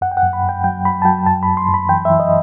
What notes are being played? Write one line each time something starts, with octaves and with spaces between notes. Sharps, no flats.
F#2 F#5
G5
F#5
F#2
B5
F#2
G5
F#3 G5
F#3 B5
A5
F#3 G5
F#2 A5
F#2 B5
C6
F#2
B5
E3 G5
E3 E5
D#5